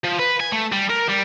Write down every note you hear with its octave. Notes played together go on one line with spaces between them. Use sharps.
F3
B4
G#5
A3
G3
A#4
G3